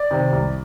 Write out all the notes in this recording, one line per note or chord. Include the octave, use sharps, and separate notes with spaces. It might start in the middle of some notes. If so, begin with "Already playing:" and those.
Already playing: D5
C3 D#3
C2